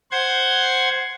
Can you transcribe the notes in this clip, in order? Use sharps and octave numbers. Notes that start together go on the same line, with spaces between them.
C5 F#5 C6 G#6